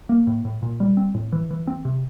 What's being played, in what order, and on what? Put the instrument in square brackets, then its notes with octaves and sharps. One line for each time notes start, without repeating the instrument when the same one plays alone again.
[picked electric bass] A#3
A2
A2
A#2
G3
C4
A2
E3
E3
C4
C3